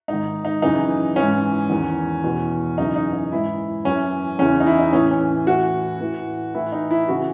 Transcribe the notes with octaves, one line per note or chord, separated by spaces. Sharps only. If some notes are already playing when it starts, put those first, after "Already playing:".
G#2 D#3 D#4
D#4
F#2 C#3 E3 D#4
G#2 E3 C#4
E2 D#3
E2 B2
F#2 C#3 E3 D#4
D#4
D#4
G#2 E3 E4
F#2 E3 C#4
E2 C#3 E3 C#4
D#4
E4
D#4
A2 E3 C#4
C#4
A2 E3 F#4
A2 E3
A2 E3 E4
D#4
E4
C#3 E3 F#4